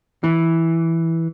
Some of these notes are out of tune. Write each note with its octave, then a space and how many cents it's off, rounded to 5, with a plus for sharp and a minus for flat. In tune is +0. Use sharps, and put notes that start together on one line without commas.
E3 -5